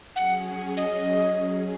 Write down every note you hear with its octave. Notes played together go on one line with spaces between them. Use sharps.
F#3 C#4 G#4 F#5
D#5